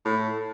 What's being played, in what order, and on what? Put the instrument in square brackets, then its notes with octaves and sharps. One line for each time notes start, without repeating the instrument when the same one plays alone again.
[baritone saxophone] A2